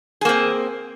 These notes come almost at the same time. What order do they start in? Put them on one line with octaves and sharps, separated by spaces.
G#4 A#3 C4